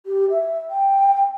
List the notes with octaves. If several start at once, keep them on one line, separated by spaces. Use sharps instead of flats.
G4
E5
G5